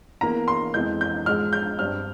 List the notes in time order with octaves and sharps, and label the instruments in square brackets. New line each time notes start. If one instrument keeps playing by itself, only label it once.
[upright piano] E2 E3 A#3 A#5
C6
F2 E3 G#3 G6
G6
G#2 F3 G#3 F6
G6
G2 G3 C4 F6